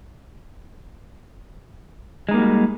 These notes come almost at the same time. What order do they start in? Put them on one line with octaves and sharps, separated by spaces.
G#3 D#4 A#3 F#4 G3